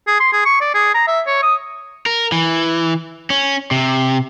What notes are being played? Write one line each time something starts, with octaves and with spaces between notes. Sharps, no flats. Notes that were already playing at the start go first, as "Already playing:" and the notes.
G#4
C6
G#4
C#6
D5
G#4
A#5
E5
C#5
D#6
A#4
E3
C#4
C3